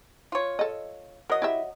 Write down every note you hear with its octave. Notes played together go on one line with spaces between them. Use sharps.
F4 C#5
A4 D#5
F#3 A#4 D#5
E4 G4 E5